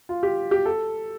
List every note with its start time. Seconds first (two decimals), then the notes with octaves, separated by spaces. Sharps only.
0.09 F4
0.23 G4
0.51 G4
0.66 A4